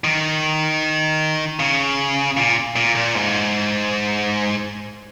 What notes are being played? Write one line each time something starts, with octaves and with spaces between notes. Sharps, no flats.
D#3
C#3
A#2
A#2
A#2
G#2